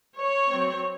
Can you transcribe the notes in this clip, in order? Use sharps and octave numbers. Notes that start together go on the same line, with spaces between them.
C#5
F#3 C4